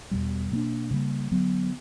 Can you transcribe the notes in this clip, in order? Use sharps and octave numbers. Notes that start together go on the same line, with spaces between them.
E2 B2 G3
B2 A#3 D4
C#3 G3 A#3
D3 F#3 B3